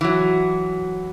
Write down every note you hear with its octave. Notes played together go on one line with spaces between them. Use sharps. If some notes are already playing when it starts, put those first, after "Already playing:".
E3 F#3